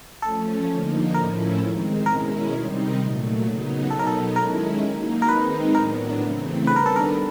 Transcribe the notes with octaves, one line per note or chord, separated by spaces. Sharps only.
F3 A3 C#4 A4
D3 F3 A#3 D#4
A2 F3 A3 C#4 E4 A#4
D#3 G#3 C4
B2 G#3 C#4 E4 A#4
C3 D#3 G3 C4 D#4
A#2 F#3 A3
C#3 F#3 B3 D#4
B2 F#3 B3 D#4 A4
A#4
A4
D#3 G#3 C#4 E4 A#4
F#3 A#3 D#4
A#4
D#3 G#3 C4 D#4 B4
A2 F#3 B3 D4 A#4
C#3 E3 A3 C4
D#3 G3 B3 D4 B4
A#4
A4
A#4